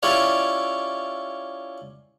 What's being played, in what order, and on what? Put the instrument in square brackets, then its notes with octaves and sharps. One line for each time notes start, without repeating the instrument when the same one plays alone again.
[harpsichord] C#4 E4 F4 G4 C#5 D5